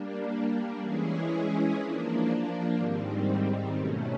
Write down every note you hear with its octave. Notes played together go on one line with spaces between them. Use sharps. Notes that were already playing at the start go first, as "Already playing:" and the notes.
Already playing: G3 A#3 D4
E3 G#3 C#4 E4 G#4
F3 A#3 D4
G#2 D#3 G3 C4
B2 F#3 A3 C#4